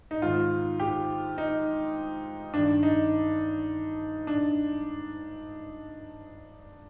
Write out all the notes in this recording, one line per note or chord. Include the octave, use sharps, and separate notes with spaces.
D#4
G#2 D#3 F4
G4
D#4
G2 D#3 D4
D#4
D4